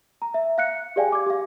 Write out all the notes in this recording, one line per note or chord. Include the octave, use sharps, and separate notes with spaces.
A#5
E5
F5 F#6 C#7
G4 G#4 D5 F5 G5 G#5
D6 G#6
G4 F5